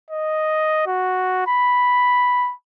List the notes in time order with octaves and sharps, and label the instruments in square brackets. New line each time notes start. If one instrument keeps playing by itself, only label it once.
[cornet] D#5
F#4
B5